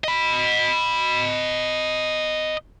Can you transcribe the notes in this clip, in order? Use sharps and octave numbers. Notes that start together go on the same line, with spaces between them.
D#5 B5